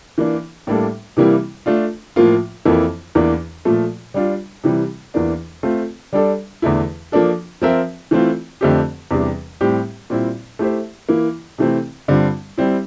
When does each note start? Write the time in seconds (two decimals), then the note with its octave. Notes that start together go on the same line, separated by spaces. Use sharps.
0.18 E3 A#3 D4
0.67 A2 G3 A#3 D4 A4
1.17 C3 E3 G3 A#3 E4
1.66 A3 D4 F4
2.16 A2 F3 A#3 F4
2.65 F2 E3 A#3 E4 A4
3.15 E2 E3 A#3 D4
3.65 A#2 F3 A3
4.14 G3 D4 F4
4.64 C3 E3 G3
5.14 E2 E3 A#3 D4
5.63 A3 C4 F4
6.13 G3 D4 A4 D5
6.62 E2 D3 A3 E4
7.12 F3 A#3 D4 A4
7.62 F3 C4 F4 A#4 E5
8.11 E3 A3 C4 F4
8.61 F2 D3 A3 C4 G4
9.11 E2 C3 G3 D4
9.61 A2 G3 C4 G4
10.10 A#2 G3 C4 E4
10.59 A3 E4 G4 C5 E5
11.09 E3 A#3 E4
11.58 C3 E3 A3 C4 E4
12.08 G2 D3 G3 C4 F4
12.58 G3 C4 E4